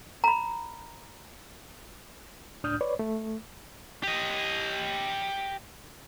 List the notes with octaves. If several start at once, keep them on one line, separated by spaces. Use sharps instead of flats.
A#5 B5
C#2 A2 D4 D#6 F6 G6
B4 C#5 D5
A3
G4 D#5